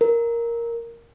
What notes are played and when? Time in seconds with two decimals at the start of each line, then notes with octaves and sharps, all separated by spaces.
0.01 A#4